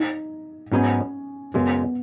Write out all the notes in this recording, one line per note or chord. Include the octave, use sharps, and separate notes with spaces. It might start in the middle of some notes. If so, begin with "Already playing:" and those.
Already playing: D#4
G#2 F#3 B3 C#4 D#4 G#4
F#2 C#3 G#3 B3